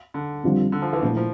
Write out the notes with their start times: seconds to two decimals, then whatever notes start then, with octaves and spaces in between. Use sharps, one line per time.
0.14 D3
0.43 F2 D3 G3 C4 F4
0.72 D3
0.82 F3
0.93 E3
1.02 A#1 A#2 F3 A3 E4
1.17 F3